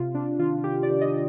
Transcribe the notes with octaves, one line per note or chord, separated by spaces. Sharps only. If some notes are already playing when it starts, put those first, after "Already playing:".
Already playing: C3 F4
C3 D4
D#3 F4
D#3 G4
D5
D#3
D#5